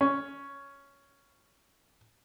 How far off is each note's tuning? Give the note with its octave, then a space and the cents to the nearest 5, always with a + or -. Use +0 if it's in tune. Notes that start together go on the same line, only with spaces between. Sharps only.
C#4 +5